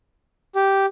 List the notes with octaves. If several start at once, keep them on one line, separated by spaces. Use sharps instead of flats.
G4